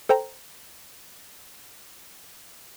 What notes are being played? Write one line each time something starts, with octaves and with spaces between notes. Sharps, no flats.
A4 C5 G5 A#5